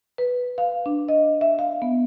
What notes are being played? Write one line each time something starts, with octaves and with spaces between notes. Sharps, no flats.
B4
F5
D4
D#5
E5
F5
B3